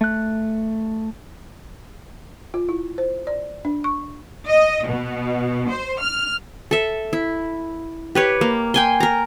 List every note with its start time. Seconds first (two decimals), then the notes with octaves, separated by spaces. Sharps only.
0.01 A3 F#6
2.54 F4
2.69 E4
2.98 C5
3.27 D5
3.65 D4
3.84 C#6
4.48 D#5
4.86 B2
5.70 C5
6.01 F6
6.71 A4 E5
7.13 E4
8.15 G4 B4 C#5
8.41 A#3
8.74 G5 G#5 C6
9.00 A#4 A#5